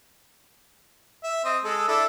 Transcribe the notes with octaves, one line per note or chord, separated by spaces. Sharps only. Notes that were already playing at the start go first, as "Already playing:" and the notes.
E5
C4 D#5
G#3 A4
D4 E4 A4